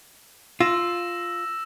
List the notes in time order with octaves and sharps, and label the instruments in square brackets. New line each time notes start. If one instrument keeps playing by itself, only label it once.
[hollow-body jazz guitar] F4 [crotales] E6 A#6 E7